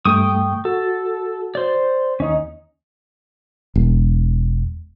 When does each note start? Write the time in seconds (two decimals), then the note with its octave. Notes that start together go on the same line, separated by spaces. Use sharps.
0.05 G2 A3 G5 C#6 D#6
0.65 F#4 A4
1.55 C5 D5
2.20 D#2 C#4 D#4 D#5
3.76 E1